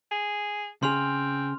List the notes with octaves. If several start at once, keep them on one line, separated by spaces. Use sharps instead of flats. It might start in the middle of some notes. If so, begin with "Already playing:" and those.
G#4
C#3 C4 G#4 C6 F6 F7